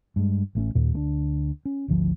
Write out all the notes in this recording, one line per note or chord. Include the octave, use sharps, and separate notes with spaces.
G2 G#3
A1 A3 B3 C#4
D#2 A#2
D2 A3 D4
C#4
G#1 D2 F3